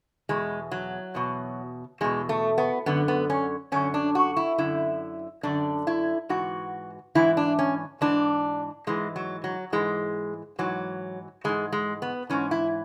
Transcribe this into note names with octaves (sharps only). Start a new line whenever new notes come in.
E2 B2 G#3
F#3
E2 B2
E2 B2 G#3
A3
B3
F#2 D3 B3
B3
C#4
F#2 D3 C#4
D4
F#4
E4
F#2 D3 E4
F#2 D3 D4
E4
G#2 E3 F#4
G#2 E3 E4
D4
C#4
G#2 E3 D4
G#2 E3 G#3
F#3
F#3
G#2 E3 G#3
G#2 E3 F#3
G#2 E3 G#3
G#3
B3
G#2 E3 C#4
E4